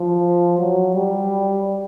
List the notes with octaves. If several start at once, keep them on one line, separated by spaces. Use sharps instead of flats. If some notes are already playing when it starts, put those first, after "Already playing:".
Already playing: F3
F#3
G3